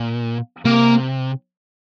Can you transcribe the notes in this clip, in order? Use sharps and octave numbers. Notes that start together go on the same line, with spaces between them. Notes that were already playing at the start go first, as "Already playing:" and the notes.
Already playing: A#2
C3 A#3